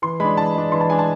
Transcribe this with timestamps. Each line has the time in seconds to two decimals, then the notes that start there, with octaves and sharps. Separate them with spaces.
0.02 E3 C6
0.20 G#3 D4 B5
0.37 E3 A5
0.55 G#3 D4
0.72 E3 C6
0.81 A5
0.89 G#3 D4 G#5
0.99 A5